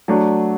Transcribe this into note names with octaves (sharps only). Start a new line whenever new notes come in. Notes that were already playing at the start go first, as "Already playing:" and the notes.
F#3 A3 D4